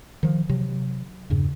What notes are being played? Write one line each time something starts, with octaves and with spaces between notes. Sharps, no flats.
D#3 F3
C3 F#3
E2 G2 C#3